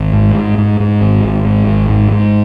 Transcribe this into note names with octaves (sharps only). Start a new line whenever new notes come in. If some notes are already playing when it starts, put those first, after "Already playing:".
Already playing: G#1
G#2
G#2
G#2
G#2
G#1
G#1
G#2
G#1
G#2
G#2